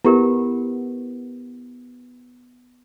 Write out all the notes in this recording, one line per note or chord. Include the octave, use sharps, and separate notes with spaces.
B3 E4 G4 A#4